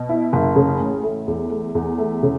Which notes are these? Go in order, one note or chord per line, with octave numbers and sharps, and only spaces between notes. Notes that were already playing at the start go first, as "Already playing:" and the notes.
Already playing: B2
E4
F#1
C#3
A1
A3
E2
A3
E2
A3
C#3